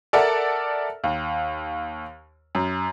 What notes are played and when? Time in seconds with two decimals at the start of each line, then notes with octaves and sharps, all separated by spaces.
0.13 A4 A#4 D5 E5 F#5 A5
1.04 D#2
2.55 F#2